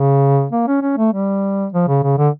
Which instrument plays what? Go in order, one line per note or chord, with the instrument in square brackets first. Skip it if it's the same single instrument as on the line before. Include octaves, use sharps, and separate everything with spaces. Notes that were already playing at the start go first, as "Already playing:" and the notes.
Already playing: [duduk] C#3
A#3
C#4
C#4
A3
G3
F3
C#3
C#3
D3